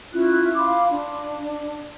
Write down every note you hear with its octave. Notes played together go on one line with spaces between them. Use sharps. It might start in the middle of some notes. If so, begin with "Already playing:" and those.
C#4 E4 F4 F#6
F5 B5 C6 D6
D4